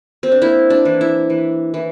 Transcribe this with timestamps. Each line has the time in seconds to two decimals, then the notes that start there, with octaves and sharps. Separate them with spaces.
0.23 C4
0.32 D4
0.42 A#3 E4
0.70 D4
0.85 E3
1.01 E4
1.30 E3
1.74 E3